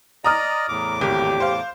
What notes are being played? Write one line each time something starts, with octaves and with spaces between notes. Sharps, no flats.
D5 D#5 A#5 D#6 F6
E2 A2 D6
G#1 G4
C5 F5